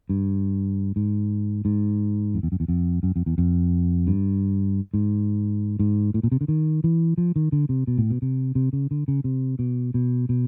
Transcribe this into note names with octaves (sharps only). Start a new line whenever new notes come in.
G2
G#2
G#2
F2
E2
F#2
E2
F2
F#2
F2
E2
F2
G2
G#2
G#2
A2
A#2
C3
D3
D#3
E3
F3
D#3
D3
C3
B2
A2
B2
C3
C3
C#3
D3
C#3
C3
B2
B2
B2